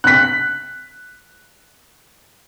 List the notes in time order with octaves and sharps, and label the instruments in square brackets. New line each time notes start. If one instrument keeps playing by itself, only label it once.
[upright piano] F#6 B6